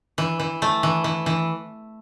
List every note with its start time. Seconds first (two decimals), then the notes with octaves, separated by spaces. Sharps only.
0.18 E3
0.40 E3
0.62 A3
0.83 E3
1.04 E3
1.26 E3